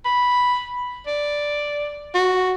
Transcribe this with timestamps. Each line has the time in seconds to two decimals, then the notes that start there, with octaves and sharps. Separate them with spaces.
0.05 B5
1.07 D5
2.15 F#4